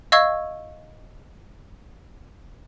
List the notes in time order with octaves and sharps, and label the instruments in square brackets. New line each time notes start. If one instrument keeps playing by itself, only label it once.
[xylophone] D#5 F5 C#6 E6 G#6